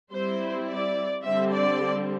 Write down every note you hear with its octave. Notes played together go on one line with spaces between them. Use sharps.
G3 C4 E4 C5
D5
D3 G3 C4 E5
D5